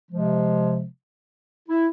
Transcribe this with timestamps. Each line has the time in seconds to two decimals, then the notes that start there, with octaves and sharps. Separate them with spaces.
0.11 C3 F3 G#3
1.69 E4